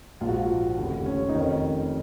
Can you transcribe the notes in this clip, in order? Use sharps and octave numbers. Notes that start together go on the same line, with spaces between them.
A#1 G#2 F3 F4
F#4
F4
F1 D#2 C#3
C#4
D#4
F1 F2 D#3 C#4